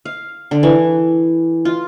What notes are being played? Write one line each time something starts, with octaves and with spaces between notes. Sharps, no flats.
F5
D3
E3
F4